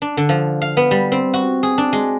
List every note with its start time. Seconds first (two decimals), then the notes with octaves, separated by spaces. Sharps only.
0.02 D4
0.17 D3
0.29 F3
0.62 F5
0.77 B3
0.91 G3
1.12 C4
1.34 F#4
1.63 G#4
1.78 D4
1.93 G#3